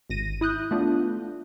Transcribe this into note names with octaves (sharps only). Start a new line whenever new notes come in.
G#1 A#6 D#7
E4 D#6 F#6 G6
A3 B3 D4 F4